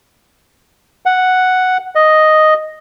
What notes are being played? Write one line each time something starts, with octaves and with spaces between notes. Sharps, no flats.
F#5
D#5